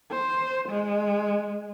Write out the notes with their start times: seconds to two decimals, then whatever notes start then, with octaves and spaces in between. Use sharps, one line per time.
0.11 C5
0.68 G#3